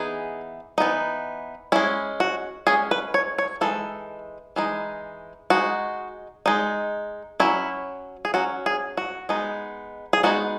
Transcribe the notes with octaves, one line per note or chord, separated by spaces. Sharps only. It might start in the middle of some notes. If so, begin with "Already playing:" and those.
Already playing: E3 B3 D#4 G#4
E3 B3 D#4
G#3 C#4 E4
F#4
G#3 C#4 G#4
B4
C#5
C#5
E3 G#3 D#4 A4
E3 G#3 D#4
G#3 D#4 F#4
G#3 D#4
F#3 C#4 E4
G#4
F#3 C#4 F#4
G#4
F#4
G#3 B3 D#4
G#4
G#3 B3 D#4 F#4